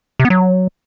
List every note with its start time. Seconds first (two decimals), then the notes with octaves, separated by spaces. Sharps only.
0.20 C3
0.25 B3
0.30 F#3